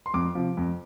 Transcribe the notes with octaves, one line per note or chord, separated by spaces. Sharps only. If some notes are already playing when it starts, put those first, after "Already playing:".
C6
F2 D6
C3 F3
F2